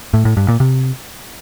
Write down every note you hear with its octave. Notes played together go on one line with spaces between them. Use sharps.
A2
A2
G2
A#2
C3